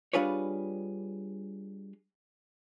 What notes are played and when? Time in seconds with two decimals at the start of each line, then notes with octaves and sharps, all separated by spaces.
0.13 G3 D4 F4 G#4 B4 C#5